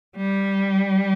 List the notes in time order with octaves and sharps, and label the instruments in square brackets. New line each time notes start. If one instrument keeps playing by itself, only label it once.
[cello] G3